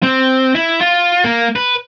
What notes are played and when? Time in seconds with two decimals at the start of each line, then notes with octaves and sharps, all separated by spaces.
0.03 C4
0.55 E4
0.81 F4
1.24 A#3
1.56 B4